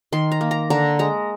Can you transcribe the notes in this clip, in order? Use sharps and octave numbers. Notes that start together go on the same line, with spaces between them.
D#3 C6
A#5
A#3
A#5
D3 A#5
G#3 A#5